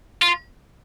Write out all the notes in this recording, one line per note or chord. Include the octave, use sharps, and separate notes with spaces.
F4